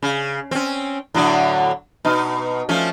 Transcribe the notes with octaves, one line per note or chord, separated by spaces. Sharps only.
C#3
C4 C#4
A2 D3 F#3
B2 D#4
F3 A3 C#4